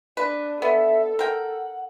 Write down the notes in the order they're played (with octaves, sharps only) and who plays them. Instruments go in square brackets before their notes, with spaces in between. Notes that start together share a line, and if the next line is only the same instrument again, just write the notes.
[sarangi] D4 [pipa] B4
[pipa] B3 [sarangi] A4 [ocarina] E5
[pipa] A#4 G5 [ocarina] F#5